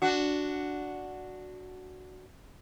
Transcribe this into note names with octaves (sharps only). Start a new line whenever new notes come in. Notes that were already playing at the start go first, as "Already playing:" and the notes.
D4 F#4